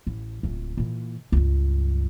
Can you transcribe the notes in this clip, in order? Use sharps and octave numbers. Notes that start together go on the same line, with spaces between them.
A1
D1 C#2
A#2 E3
C#2 G2